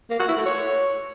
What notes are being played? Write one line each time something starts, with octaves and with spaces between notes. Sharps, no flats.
A#3
F#4
E4
A3
C#5